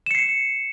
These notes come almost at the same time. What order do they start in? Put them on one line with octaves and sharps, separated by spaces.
E7 C#7 C7